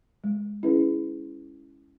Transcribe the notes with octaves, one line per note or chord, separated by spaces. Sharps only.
G#3
C#4 E4 G#4 B4